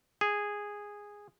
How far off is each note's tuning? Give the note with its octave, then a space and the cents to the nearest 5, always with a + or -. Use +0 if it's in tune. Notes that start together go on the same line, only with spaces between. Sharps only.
G#4 -10